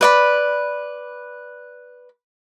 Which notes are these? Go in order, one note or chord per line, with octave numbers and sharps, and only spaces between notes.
B4 D5 B5